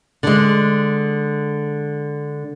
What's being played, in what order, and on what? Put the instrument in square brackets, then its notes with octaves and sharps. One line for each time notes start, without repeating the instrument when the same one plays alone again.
[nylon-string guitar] D3 G#3